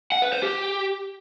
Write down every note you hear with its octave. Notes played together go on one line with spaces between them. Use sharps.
F#5
B4
C5
G4